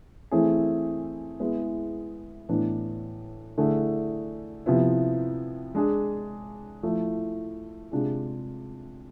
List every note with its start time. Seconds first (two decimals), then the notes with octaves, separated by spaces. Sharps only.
0.31 E3 A3 C4 E4 G#4
1.40 G#3 B3 E4 G#4
2.49 A2 E3 B3 D4
3.58 D3 A3 E4 G#4
4.66 C3 F3 B3 E4
5.75 G#3 D4 G#4
6.83 F3 A3 E4
7.92 C3 G#3 D4 F4 G#4